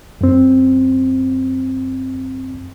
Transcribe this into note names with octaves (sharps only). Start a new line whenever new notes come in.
F#2 C4